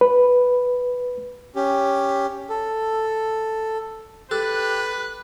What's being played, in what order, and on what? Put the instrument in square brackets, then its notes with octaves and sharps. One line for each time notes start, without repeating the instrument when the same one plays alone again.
[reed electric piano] B4
[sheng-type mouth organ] C#4 G4
A4
[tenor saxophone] G4 [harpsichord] A4 [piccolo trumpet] B4 [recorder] F#6